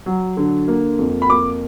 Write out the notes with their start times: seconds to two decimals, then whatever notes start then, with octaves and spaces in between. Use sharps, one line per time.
0.06 F#3
0.37 D3
0.68 A#3
0.99 F2
1.22 B5
1.30 A#3 D6